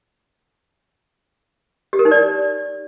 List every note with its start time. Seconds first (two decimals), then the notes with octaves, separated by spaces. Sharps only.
1.93 G4
1.99 A#4
2.05 D#4
2.11 D5